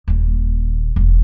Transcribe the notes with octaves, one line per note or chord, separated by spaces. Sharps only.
D#1 A#2
E1 A#3